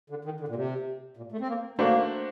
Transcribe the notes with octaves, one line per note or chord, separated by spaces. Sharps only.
D3
D#3
D3
A#2
C3
A#2
A3
C4
A#3
A3 A#3 D4 F#4 C5